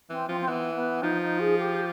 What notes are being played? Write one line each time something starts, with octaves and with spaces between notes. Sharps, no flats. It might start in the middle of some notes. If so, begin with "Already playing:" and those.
E3 C4
F3 C4
C4
E3 B3
B3
F3 D#4
D#4
G#4
G4